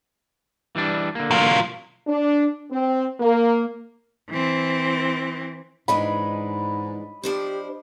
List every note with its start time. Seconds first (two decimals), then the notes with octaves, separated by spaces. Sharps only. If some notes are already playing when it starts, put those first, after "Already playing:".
0.76 E3 G3 D4
1.15 D3 A#3
1.31 F#3 F4
2.07 D4
2.71 C4
3.19 A#3
4.30 E3 C4
5.88 G#2 E3 G#3 D4 D#5 B5
7.23 F3 D4 G4 C5